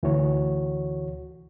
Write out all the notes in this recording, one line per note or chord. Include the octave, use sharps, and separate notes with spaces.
D2 E3 F#4 C#5